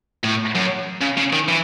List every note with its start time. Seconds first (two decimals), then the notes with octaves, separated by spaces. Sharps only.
0.24 A2
0.55 F#2
1.01 C#3
1.17 C#3
1.33 D#3
1.48 E3